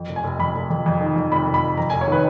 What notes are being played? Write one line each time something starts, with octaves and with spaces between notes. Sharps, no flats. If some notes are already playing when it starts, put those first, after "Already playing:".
Already playing: F2
F1
G#5
F1
F2 B5
F1
F2
F2
D#3
F2
F1 B5
F1
B5
F1
F2 A#5
G#5
F1
C#5
D#3 B4